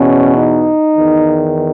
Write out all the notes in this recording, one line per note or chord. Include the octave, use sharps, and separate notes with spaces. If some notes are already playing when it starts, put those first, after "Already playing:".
Already playing: E2 B2 C#4
D#4
E2 D#3